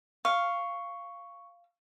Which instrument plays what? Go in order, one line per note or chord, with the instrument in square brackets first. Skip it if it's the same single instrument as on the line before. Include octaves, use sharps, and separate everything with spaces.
[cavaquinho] F5 [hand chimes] C#6